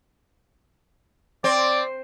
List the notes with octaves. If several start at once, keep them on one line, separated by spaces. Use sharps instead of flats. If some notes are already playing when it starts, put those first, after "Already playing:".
C4 D5